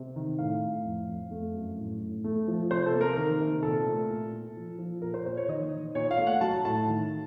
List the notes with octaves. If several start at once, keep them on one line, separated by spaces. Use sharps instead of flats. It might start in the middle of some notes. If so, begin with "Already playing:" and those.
Already playing: C3
D#3
A2 F5
A2
F2
F2
A3
F#2
A2
A2
A3
F3
C3 C5
A4
A#3
A#4
D#3 A#4
C3
A#2 A4
A3
A#2
A#2
F3
F3
A#2 A#4
C5
A#2 C5
C#5
D#3 D#5
D#3
A#2 C#5
F5
A3
F#5
F#3 A5
A2 A5
D#3